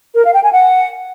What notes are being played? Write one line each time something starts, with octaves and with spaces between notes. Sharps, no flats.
A#4
F5
G5
G#5
F#5